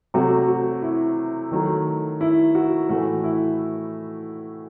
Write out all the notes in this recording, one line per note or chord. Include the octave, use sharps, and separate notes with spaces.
C3 F#3 A3 F#4
F#4
E4
D#3 F#3 A3
E4
F#4
A2 E3 A3 F#4
E4